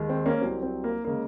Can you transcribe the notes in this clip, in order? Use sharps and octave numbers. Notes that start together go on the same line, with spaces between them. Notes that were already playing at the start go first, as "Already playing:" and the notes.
Already playing: D#2 D#3 G#3
C4
A#3 C#4
C2 C3 F#3 C4
C4
A#3
C#3 G#3 A#3